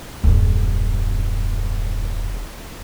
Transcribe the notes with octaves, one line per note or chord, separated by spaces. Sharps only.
D#1 F#2